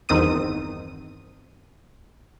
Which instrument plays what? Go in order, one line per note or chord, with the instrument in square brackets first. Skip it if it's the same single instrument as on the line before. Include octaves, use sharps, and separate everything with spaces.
[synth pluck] G1 E2 D#3 C4 D#6 D#7